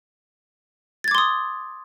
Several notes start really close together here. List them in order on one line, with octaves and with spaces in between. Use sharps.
A6 G#6 D6 C6 D#6